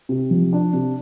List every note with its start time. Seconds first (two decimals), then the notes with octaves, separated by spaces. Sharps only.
0.09 C3
0.31 F3
0.53 D4
0.73 C3